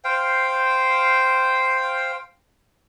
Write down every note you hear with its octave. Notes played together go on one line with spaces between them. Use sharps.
C5 F5 G5